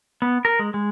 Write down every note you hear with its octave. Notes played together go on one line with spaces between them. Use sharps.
B3
A#4
G#3
G#3